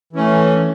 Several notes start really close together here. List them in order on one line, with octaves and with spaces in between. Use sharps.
E3 C#4 A3